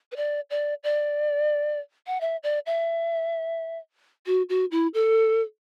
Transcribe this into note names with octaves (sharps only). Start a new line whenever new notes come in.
B4
D5
D5
D5
F#5
E5
D5
E5
F#4
F#4
E4
A4